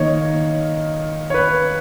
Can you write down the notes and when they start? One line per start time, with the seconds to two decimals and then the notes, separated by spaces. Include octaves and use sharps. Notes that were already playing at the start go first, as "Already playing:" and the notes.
Already playing: D#3 A#3 C#5 D#5
1.30 C#5
1.34 B4